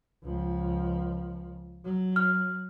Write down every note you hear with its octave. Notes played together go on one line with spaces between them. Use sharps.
C#2 F3
F#3
F6